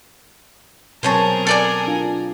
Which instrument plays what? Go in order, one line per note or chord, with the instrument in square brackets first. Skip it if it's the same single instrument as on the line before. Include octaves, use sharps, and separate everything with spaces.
[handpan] B2 F#3 C4 [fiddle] G#4 A#4 [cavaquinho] C5 C#5 A5
[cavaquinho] A4 D5 G#5
[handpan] D4 F4